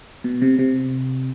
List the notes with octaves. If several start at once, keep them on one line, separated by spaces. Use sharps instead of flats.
B2
C3
C3